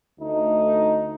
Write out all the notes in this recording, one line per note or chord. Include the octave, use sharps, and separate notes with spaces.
D2 A3 D#4